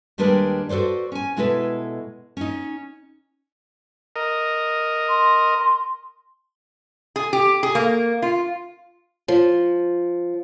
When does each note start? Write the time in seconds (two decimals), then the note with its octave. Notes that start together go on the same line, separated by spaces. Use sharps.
0.18 D#2 G3 G#3 D4 A#4 B4
0.69 F#4 A4 B4 C5 D5
1.12 C#4 G#5
1.37 B2 G#3 E4 A4 B4
2.37 C#4 D#4
4.16 A#4 D#5
5.09 C6
7.16 G#4
7.33 G4
7.63 G#4
7.75 A#3
8.22 F4
9.28 F3